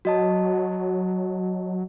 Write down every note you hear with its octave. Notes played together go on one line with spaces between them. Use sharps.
F#3 F#4 D#5 A5